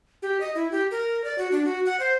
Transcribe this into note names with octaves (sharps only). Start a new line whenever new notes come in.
G4
D#5
E4
G4
A#4
D5
F#4
D4
F#4
F#5
C5